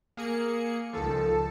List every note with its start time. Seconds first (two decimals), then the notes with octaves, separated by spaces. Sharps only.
0.17 A#3 G#4 C#7
0.93 C#2 D#3 F3 A4